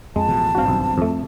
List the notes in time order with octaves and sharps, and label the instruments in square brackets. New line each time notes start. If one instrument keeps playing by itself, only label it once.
[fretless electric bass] F2 [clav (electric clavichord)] G#3 [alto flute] A5
[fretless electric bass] A1 B2 F3
[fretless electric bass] G#1 G2 C4 [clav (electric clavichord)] F#4 F5
[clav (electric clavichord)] B1
F2 A3